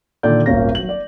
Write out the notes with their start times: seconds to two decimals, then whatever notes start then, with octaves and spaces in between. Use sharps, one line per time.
0.23 A#2 D3 D#3 A4 D5 G6
0.46 D#1 G#1 A#3 C#4 F5 A#6
0.75 F#3 F#7
0.89 D5